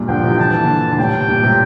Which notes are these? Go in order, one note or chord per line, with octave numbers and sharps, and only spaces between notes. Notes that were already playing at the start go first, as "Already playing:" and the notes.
Already playing: G2 A#2
D3 F3 G5
C3 E3
D3 A5
E3
A#2 D3
D3
A2 C3 G5
G2 A#2
A2 C3